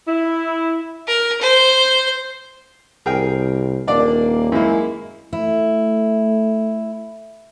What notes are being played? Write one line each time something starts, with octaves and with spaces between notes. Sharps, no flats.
E4
A#4
C5
C2 G#4 A#4 G5
D#1 A#3 D4 D5
F#2 G#3 A#3 E4
A3 E4